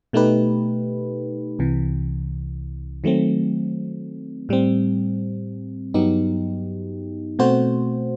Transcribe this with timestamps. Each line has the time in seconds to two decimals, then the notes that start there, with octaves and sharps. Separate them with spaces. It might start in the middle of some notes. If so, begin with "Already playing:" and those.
0.13 B2 A3 D#4 G4 B4
1.59 C2 C3 E3
3.04 D#3 F#3 A3 C4
4.49 A2 G3 C4
5.94 G2 F#3 B3 D#4 G4
7.39 B2 A3 C4 F#4 C5